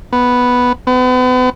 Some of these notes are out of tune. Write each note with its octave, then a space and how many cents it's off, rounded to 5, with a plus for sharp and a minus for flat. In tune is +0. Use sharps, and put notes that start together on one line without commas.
B3 +0
B3 +40